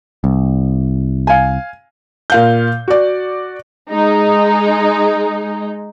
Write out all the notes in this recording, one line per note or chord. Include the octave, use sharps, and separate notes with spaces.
C2
F5 G#5
A#2 F5 G6
F#4 D5
G#3 D#4